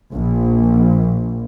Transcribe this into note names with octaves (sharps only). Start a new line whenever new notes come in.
A#1